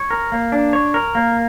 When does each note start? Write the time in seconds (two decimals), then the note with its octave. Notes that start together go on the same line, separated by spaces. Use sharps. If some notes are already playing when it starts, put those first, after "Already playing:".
Already playing: C#5
0.11 A#4
0.32 A#3
0.52 D4
0.73 C#5
0.94 A#4
1.15 A#3